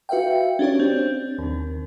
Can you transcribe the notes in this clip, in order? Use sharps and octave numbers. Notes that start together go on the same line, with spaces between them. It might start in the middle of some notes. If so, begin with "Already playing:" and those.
F#4 B4 E5 F5 G5
C#4 D4 G4 C#5
C4 D4
D#2 D#3